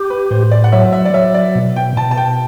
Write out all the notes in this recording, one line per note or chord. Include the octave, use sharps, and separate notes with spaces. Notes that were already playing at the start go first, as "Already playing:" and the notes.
Already playing: G4
B4
A2 C5
D5
F#5
F#3 E5
E5
D5
F#3 E5
D5
B2
G5
B2 A5
A5
G5